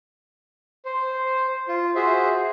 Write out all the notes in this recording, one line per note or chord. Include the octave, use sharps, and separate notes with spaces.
C5
F4
F#4 G#4 C5 E5